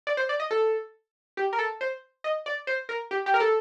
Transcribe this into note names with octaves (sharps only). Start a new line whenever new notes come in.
D5
C5
D5
D#5
A4
G4
A#4
A4
C5
D#5
D5
C5
A#4
G4
G4
A#4
A4